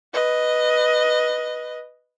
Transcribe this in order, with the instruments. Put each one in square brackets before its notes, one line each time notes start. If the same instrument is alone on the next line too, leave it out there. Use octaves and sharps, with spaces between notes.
[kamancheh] B4 D#5